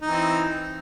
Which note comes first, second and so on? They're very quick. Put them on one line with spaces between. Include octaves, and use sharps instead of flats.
D#4 E3 C4